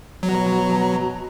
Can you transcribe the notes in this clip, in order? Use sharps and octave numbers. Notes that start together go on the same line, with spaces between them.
B2 F#3 F#4 A#5